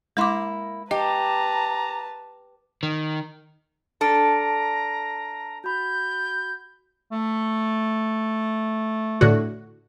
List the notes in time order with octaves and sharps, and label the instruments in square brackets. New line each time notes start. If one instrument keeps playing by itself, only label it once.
[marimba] G#3 C6 D6 [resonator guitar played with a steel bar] A#3 E4
[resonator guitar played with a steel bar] G4 [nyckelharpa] B4 A5 [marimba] D#5 [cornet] A#5
[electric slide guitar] D#3
[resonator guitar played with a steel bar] D4 A4 [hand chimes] A5 F6 D7 [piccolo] A#5
[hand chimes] F#4 B5 [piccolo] G6
[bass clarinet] A3
[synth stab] A2 D3 F#4